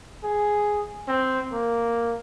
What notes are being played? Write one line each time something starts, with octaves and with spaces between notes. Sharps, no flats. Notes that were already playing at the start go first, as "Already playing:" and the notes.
G#4
C4
A#3